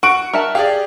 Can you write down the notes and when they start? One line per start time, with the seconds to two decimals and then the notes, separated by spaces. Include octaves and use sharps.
0.03 F#4 F#5 C#6 D7
0.33 A#4 E5 A5
0.55 G4 G#4 D5 F5